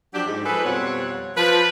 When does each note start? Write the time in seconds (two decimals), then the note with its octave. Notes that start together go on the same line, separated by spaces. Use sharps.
0.15 F3 F#3 D4 G4
0.27 G#2
0.46 F3 G#4 A4 B4
0.65 F2 B2 G3 C4 C#5 F#5
1.37 F3 B4